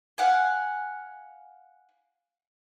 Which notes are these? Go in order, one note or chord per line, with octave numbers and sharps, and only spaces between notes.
F5 F#5 G#5